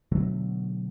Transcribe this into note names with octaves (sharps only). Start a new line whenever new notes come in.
B2 D3 F#3 A3